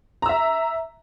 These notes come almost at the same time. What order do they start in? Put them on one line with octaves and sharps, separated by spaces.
A#5 E6 E5